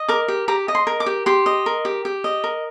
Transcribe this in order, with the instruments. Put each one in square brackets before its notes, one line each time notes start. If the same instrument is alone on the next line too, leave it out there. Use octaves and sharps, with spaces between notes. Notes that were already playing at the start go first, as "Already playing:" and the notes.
Already playing: [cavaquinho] D#5
A#4 D6
G4
G4 A#5
D#5
C6
A#4
D6
G4
G4 C6
D#5
A#4
G4
G4
D#5
A#4